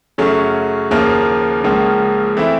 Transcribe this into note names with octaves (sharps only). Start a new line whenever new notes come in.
F#2 C#3 F#3 A3 C#4
D#2 C#3 F3 A#3
C#2 C#3 F3 A#3 C#4
E3 A3 C4 E4